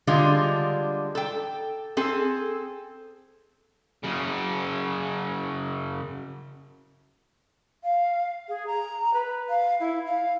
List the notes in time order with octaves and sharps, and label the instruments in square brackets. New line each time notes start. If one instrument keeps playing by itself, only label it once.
[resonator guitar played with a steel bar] D3 G3 G#3 D4 F4
A4 G5
C4 G#4 A4
[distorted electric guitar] F#2 C#3
[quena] F5
G#4
A#5
B4
F5
E4
F5